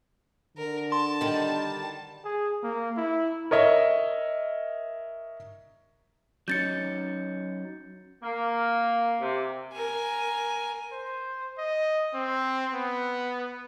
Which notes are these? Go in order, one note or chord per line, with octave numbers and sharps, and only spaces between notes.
D3 A#4
A5 C6
D#3 G3
G#4
A#3
E4
A#4 C#5 D#5 E5
F#3 C#4 D#4 G6 A6 C#7
A#3
C3
A#4 G#5
C5
D#5
C4
B3